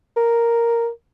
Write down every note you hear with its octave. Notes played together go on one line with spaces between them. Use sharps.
A#4